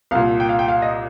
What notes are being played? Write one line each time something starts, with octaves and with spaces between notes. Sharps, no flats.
C2 A#2 F5
G5
F5
G5
F5
D#5